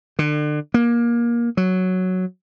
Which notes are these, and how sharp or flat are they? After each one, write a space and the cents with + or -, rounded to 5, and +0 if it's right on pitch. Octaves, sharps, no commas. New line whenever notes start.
D3 +35
A#3 +20
F#3 +0